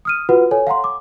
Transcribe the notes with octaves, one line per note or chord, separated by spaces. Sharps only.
D#6 F6 D#7
F4 F#4 B4 F#5
A4 C#5 G#5
F5 F#5 A#5 C6
D6